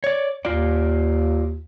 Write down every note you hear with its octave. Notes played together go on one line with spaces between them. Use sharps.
C#5 D5
D#2 F4 D5